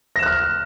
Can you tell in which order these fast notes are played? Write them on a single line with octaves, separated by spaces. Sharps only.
A#6 E7 F#6 F6